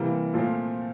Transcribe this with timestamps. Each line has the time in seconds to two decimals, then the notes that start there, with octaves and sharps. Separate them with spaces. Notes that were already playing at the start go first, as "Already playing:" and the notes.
Already playing: C3 E3 G3 A#3
0.34 A#2 F3 A3 C4 F4